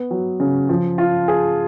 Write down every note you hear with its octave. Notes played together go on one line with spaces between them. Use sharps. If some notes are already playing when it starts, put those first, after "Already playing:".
Already playing: B3
F#3
C#3
F3
F4
G#4